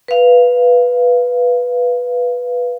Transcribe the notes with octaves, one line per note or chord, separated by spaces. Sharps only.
B4 F5